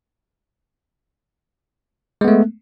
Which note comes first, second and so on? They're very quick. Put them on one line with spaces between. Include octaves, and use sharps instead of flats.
G#3 B3 A3